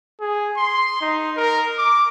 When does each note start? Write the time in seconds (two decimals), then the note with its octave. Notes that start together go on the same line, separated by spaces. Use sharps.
0.21 G#4
0.57 C6
1.01 D#4
1.37 A#4
1.78 D6